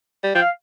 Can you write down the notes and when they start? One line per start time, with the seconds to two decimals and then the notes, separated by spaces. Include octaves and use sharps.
0.23 G3
0.35 F3 G5
0.42 F5